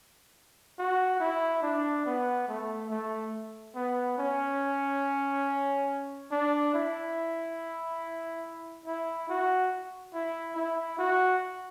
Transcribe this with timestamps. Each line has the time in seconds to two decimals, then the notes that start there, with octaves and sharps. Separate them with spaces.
0.79 F#4
1.20 E4
1.63 D4
2.06 B3
2.48 A3
2.90 A3
3.75 B3
4.19 C#4
6.31 D4
6.74 E4
8.86 E4
9.29 F#4
10.14 E4
10.56 E4
10.98 F#4